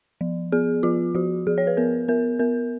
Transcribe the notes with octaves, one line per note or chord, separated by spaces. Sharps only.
F3
B3 G#4
F3 F4
F3 F#4
F3 G#4
C#5
B4
B3 A#4
B3 A#4
B3 A#4